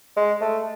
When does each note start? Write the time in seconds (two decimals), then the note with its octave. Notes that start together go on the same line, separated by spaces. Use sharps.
0.17 G#3
0.41 A3